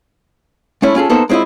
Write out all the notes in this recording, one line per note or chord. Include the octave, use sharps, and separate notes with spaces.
G#3 A3 C#4 E4
C#4 F4 G#4 A4
A#3 B3 D#4 A4 A#4 C5
G#3 C4 E4 F4 D#5